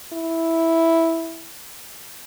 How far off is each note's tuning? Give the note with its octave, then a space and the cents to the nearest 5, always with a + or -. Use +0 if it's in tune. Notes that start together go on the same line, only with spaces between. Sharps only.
E4 -5